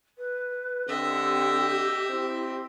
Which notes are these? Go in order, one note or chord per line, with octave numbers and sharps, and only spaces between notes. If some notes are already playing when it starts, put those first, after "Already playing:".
B4
D3 C4 G4 D#5 E5
C4 E4